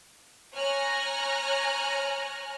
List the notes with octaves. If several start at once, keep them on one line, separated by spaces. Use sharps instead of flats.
C#5 G#5 A#5 F6 F#6